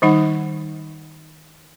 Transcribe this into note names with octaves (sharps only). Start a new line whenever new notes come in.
D#3 G3 D#4 F#5